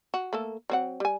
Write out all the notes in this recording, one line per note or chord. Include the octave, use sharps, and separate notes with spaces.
F#4
A3 A#3 A4
F#3 C4 F#5
G3 G#5